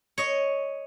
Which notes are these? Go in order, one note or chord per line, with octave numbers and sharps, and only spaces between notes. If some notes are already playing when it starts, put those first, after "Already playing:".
C#5 D#5